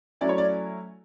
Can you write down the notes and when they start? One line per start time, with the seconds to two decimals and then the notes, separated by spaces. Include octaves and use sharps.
0.21 F#3 A3 C#4 E4 D5
0.29 C#5
0.38 D5